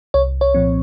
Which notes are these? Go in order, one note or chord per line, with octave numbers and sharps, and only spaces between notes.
C2 C#5
C#5
A#2 F3 C4